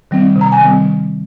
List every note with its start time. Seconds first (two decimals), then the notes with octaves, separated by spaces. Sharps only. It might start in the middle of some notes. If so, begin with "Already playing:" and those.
0.11 D#3 G3 C4
0.36 C3
0.41 A#5
0.52 G#5
0.60 D#3 G3 C4